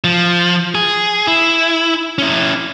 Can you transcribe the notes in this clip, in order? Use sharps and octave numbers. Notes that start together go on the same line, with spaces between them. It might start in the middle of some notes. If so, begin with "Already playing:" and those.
F3
G#4
E4
C#4 E4